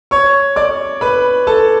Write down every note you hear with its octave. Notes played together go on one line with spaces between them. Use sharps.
C#5 C#6
D5 D6
B4 B5
A4 A5